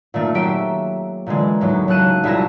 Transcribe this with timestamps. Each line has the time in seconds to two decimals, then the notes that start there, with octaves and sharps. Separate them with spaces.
0.14 A#2 D#3 A3 A#3
0.34 F#3 C4 G4 E5 D7
1.26 A#2 D3 E3 G#3
1.61 D#2 A2 F#3
1.88 F#1 F#3 A5 F#6 D#7 E7
2.24 C2 A#2 E4 G#4 A5 A#6